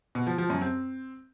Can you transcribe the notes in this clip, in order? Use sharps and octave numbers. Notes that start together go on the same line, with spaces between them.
B2
F3
F3
F#2
C4